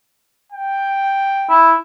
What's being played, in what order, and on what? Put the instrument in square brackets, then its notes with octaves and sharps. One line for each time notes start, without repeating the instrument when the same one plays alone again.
[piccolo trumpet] G5
[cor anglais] E4